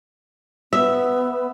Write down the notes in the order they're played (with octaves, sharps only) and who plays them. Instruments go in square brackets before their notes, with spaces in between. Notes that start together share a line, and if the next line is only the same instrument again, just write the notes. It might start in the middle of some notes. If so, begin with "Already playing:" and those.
[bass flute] B3 [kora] E5